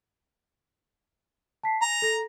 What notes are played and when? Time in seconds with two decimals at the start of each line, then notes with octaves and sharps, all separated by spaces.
1.63 A5 B6 C7
1.82 G#5 A#5
2.02 A4 A#6